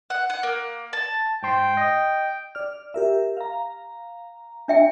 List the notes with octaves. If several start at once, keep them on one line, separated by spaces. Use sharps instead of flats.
F#5
F#5
A#3
A5
G#2 C5 G5
D#5
D5 F6
G4 A#4 E5
F5 A#5
D4 E5 G5